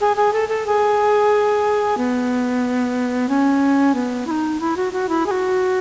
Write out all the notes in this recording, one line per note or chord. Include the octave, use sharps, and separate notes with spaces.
G#4
G#4
A4
A4
G#4
B3
C#4
B3
E4
D#4
E4
F#4
F#4
E4
G#4
F#4